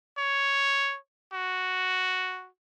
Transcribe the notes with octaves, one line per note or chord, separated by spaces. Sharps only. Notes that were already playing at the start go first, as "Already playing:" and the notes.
C#5
F#4